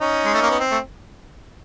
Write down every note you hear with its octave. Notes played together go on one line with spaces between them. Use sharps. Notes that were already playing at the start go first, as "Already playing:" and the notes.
C#4 D#4
G#3
A3
A#3
B3
C4
A3